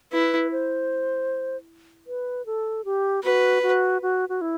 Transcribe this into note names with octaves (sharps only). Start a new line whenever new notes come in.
E4 B4
C5
B4
A4
G4
F#4 B4
F#4
F#4
F#4
E4